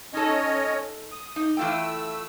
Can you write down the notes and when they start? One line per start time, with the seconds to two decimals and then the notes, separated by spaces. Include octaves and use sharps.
0.13 C#4 D#4 A4 C#5 D#5
1.12 D#6
1.36 D#4
1.57 E3 A3 F4 G5 E6